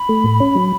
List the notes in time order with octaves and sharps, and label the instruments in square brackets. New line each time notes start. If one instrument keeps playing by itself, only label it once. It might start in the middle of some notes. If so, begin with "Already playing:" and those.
Already playing: [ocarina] B5
[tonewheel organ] A3
A2
C#4
F#3